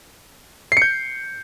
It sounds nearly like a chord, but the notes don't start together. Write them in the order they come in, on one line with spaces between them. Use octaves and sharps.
C7 C#7 G6